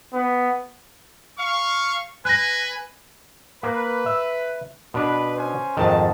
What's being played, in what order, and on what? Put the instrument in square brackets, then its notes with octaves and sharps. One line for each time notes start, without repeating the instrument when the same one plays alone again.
[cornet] B3
[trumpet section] F5 C#6
[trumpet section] B4 G#5 [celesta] F#6 A#6
[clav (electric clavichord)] A#3 [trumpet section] B4
[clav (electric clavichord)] E5
[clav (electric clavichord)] B2 D4 [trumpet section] B4
[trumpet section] C#4 C5 G#5
[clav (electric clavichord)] F2 G#2 D#3 [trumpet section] A5